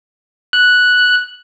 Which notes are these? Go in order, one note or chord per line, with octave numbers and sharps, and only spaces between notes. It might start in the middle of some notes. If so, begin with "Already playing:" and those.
F#6